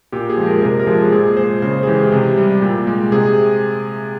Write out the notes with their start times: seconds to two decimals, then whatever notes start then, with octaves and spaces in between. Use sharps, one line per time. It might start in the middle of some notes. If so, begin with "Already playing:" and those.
0.12 A#2 G4
0.30 G#4
0.37 F3 G#3
0.46 A#4
0.62 C3 A#4
0.80 A#4
0.87 F3 G#3 G#4
1.12 A#2 G#4
1.37 G#3 C5
1.62 C#3 C5
1.83 G#4
1.87 E3 G#3 G4
2.12 C3
2.37 G3
2.62 A#2
2.87 G#3
3.12 C3 G#4